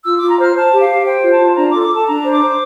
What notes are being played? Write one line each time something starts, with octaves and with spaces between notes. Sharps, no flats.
F4 E6
F4 D6
A#5
C5 F6
C5 A5
G4
F5
G4
C5 G5
F4
A5
F4
D4 A#5
D6
A4
D6
A4 A5
D4 A#5
C5
D6
C5